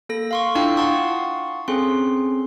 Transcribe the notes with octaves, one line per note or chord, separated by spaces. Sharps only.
A#3 A4 A#6
F5 C6 C#6
D4 E4 F4 F5 G5
F5 F#5 A5 C6 C#6 D#6
C4 C#4 G#4 A4 C6